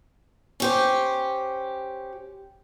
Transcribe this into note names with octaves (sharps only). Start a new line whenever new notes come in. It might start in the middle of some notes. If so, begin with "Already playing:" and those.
C#4 G4 C5